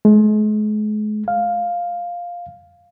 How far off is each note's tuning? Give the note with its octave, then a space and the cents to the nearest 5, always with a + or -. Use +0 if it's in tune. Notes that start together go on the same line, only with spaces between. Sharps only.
G#3 +40
F5 +5